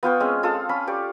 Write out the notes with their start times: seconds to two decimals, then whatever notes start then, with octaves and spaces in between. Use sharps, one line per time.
0.03 B3 F4 G5 C#6
0.20 G#3 C4 C#4 G#4
0.43 F4 A4 C6 D#6
0.69 C#4 B5
0.87 G4 D5 C#6